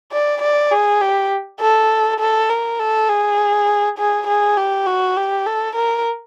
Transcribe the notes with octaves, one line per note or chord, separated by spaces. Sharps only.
D5
D5
G#4
G4
A4
A4
A#4
A4
G#4
G#4
G#4
G4
F#4
G4
A4
A#4